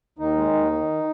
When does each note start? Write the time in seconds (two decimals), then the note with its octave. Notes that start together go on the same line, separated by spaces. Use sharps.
0.18 D#2 D#3 D#4
0.36 G#3
0.54 D#2
0.72 D#3